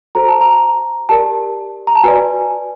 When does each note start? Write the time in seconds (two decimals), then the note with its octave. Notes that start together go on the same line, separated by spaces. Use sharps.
0.15 F#4 A4 C5 A#5
0.28 A5
0.41 A#5
1.09 G4 A#4 D5 A5
1.87 A#5
1.95 A5
2.03 F#4 B4 D5 G#5